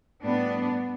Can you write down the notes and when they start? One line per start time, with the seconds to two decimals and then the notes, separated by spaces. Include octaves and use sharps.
0.22 A2 G3 B3 D4